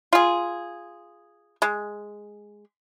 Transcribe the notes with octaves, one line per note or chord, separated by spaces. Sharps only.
F4 G#4
G#3